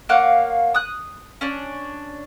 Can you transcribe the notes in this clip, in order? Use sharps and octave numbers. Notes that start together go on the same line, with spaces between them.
A#3 C#5 F5 F#5
D#6 F#6
C#4 D4